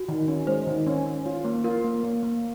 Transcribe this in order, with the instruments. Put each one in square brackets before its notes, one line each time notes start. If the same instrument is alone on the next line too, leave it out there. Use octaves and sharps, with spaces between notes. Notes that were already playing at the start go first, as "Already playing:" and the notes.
Already playing: [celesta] F#4
[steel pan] D#3
C#4
[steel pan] G#3 [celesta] C5
[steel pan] D#3
C#4
C#4
F4
A#3
[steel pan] F4 [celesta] A#4
[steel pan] A#3
A#3
A#3